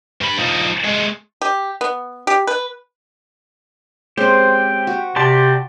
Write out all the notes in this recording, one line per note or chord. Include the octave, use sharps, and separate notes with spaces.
G2 B5
F3 D#4
G#3 A3
G4
B3
G4
B4
G#3 C4 C#4 G4 C5
F#4
C3 G4 D5 A5 C6